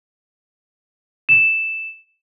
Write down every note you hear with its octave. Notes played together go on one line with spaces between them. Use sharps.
E7